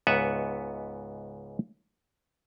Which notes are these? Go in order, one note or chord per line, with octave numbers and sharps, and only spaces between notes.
C#2 G#2 B3 B4 E5 F#5